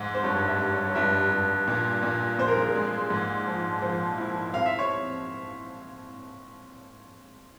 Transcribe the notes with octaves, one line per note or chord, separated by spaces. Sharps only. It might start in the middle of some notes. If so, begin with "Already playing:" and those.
Already playing: G#2
C5
G2 C#5
E5
G3
C#5
C#5
G2 E5
G2
A#2
A#2
A#2 C5
A#4
G#4
A#4
G#3
G#2
F3
F3 C5
E4
C4 F5
E5
C#5